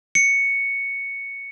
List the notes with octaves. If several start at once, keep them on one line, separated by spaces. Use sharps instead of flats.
C#7